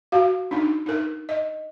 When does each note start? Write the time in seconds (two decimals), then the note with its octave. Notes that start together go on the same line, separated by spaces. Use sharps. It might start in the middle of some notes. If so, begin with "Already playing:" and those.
0.12 F#4 F5
0.51 D4 D#4
0.86 D#4 A#4
1.29 D#5